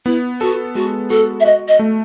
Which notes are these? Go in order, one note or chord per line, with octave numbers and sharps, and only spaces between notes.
B3 E4
F#4 A4
G#3 F#4
F#4 A4
E5
F#4 D#5
D#5
A3